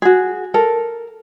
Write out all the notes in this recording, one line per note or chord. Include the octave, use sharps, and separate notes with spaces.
F#4 G#4
A4 A#4